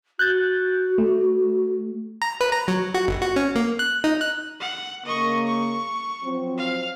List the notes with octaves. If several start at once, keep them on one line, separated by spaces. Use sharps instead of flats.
F#4 F#6 G6 A6
A3
A#5
B4
A#5
F#3
F#4
G1
F#4
C#4
A#3
F#6
D#4
F#6
F#5
C#3 A#3 D#5 C#6
C#6
F3 F#3 C4
F5